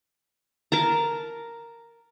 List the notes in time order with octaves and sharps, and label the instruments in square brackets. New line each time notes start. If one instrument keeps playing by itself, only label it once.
[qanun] A#4 A5 A#5